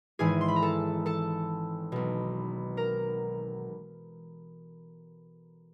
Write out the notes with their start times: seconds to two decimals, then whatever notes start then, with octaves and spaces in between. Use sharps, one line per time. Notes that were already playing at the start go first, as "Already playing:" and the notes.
0.19 G#1 G#2 E3 G#4 G#5
0.41 C6
0.48 B5
0.56 A#5
0.62 A4 A5
1.06 A4 A5
1.92 B1 B2
2.77 A#4 A#5